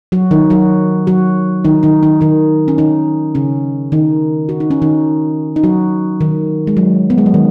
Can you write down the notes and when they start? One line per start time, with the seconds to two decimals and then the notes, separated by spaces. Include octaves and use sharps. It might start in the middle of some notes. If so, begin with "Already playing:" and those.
0.12 F#3 F#4
0.31 D#3 D#4
0.50 F#3 F#4
1.07 F#3 F#4
1.64 D#3 D#4
1.83 D#3 D#4
2.03 D#3 D#4
2.21 D#3 D#4
2.68 C#4
2.78 D#3 D#4
3.35 C#3 C#4
3.92 D#3 D#4
4.49 F#4
4.60 D#4
4.71 C#4
4.82 D#3 D#4
5.56 D#4
5.64 F#3 F#4
6.21 D#3
6.67 G#3
6.77 F#3
7.10 B3
7.18 G#3
7.26 F#3
7.34 D#3